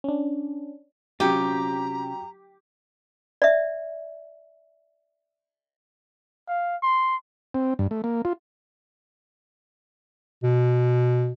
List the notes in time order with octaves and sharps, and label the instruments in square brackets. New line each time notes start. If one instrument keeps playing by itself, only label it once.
[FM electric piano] C#4 D4
[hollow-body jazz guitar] C3 C#4 F4 [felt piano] F#3 G5 [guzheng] G4 [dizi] A#5
[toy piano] D5 E5
[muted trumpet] F5
C6
[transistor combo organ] C4
G2
A3
A#3
F4
[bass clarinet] B2